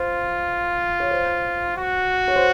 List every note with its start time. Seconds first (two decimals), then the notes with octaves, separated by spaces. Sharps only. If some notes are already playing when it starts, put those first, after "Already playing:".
Already playing: F4 C5
1.00 C#5
1.11 C5
1.77 F#4
2.28 C#5
2.36 C5